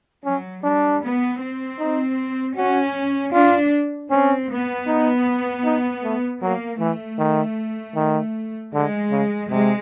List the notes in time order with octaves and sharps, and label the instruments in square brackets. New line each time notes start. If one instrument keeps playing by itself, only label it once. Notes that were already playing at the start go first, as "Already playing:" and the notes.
[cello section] F#3 [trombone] C#4
[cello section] G3 [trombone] D4
[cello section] B3
C4
[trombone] D#4
[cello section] C#4 [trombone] F#4
[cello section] D4 [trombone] F4
[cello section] C4 [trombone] C#4
[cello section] B3
[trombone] D#4
D#4
A3
[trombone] F#3 [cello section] A#3
[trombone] E3 [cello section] A3
[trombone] D#3
D#3
[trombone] D3 [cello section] G#3
[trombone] C#3
[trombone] C3 [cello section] G#3